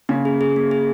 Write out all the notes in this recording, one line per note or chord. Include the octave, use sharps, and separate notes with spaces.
C#3 A#3
G#4
G#4
A#3
G#4